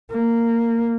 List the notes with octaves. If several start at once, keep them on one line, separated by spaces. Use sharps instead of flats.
A#3